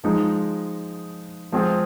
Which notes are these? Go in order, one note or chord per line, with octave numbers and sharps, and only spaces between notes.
F3 G#3 D#4
F3 G#3 C4 F4 G#4